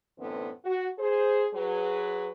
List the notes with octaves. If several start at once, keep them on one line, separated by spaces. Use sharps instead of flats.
F#2 A2 D3 E3 B3 C4
F#4
G#4 C5
F#3 G#4 B4